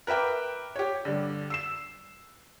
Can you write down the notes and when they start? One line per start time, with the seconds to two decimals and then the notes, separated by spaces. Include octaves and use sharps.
0.07 A#4 B4 E5 G5 D6
0.76 G4 C#5
1.05 G2 D3
1.50 E6 C7 E7